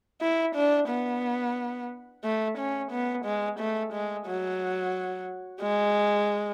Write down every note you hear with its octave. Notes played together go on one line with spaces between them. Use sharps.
E4
D4
B3
A3
C#4
B3
G#3
A3
G#3
F#3
G#3